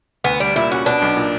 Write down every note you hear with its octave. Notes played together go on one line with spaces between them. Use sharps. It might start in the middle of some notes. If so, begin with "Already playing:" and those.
D2 B3
G3 D4
A#2 E4
C#4 F#4
B2 D4
B1
A#2